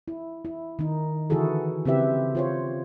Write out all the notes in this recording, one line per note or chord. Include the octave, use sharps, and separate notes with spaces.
E4
E4
D#3 D#4
D3 E3 E4 F#4 G#4 A4
C#3 C4 E4 G4 B4 E5
F4 C5 C#5